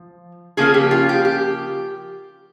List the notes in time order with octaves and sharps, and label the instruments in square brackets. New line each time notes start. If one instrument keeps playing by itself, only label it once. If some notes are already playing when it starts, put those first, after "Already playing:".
Already playing: [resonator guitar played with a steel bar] F3
C#3 F3 A#3 C#4 F4 G#4
G4
F4
G4
G4